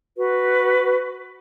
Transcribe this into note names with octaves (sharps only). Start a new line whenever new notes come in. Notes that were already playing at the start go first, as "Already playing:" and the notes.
F#4 B4